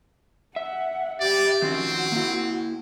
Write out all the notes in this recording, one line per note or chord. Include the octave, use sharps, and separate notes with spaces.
E5 F#5
G4 D5
D#3 F3 C4 C#4 F#4
A#3 E4